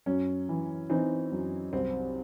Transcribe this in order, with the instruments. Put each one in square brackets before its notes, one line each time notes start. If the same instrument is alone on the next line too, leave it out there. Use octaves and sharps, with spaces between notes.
[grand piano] F#2 C#4
E3
E3 C4 D#4
F#2
C2 C4